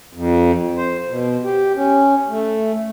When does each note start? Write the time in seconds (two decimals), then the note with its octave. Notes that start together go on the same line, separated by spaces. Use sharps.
0.13 F2
0.77 C5
1.09 B2
1.44 G4
1.76 C#4
2.29 A3